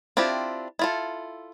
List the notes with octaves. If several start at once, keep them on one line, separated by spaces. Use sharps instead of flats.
C4 D4 E4 F4 G4
E4 F4 A4